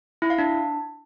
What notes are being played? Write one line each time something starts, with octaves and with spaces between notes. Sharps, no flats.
E4
F5
D4